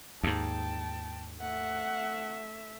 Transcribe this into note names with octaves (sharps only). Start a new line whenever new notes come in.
D#2 G#2 G5 A5
A3 E5 F#5